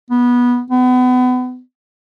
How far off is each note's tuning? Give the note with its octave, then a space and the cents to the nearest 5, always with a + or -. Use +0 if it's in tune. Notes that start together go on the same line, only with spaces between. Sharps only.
B3 -15
B3 +30